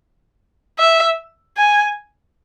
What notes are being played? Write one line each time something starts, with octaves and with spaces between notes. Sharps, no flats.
E5
G#5